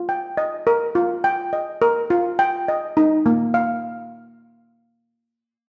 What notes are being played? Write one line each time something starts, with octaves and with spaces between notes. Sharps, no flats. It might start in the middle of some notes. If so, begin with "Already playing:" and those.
Already playing: F4
G5
D#5
A#4
F4
G5
D#5
A#4
F4
G5
D#5
D#4
A#3
F5